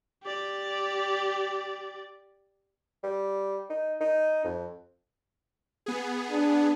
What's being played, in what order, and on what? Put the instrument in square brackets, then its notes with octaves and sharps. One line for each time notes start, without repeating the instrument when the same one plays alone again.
[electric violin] G4 D5
[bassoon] G3
D#4
D#4
F2
[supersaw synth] B3 G#4
[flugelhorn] D4